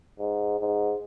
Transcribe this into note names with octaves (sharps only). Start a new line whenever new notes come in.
G#2
G#2